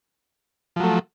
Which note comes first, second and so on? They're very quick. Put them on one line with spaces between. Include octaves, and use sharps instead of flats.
F3 F#3 A3